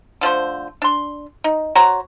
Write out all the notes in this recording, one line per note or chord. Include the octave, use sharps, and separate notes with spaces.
D3 F3 A3 C5
D4 C6
D#4
F#4 C5 C#5 A#5